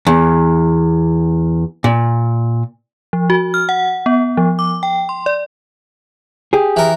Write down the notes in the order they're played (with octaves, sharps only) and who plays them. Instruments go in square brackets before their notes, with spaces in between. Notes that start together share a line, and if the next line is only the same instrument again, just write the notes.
[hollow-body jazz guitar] E2
A#2
[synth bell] F3
F#4
F6
F#5
B3
F3
D6
G5
C6
D5
[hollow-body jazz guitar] G4 G#4
[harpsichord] E3 A#4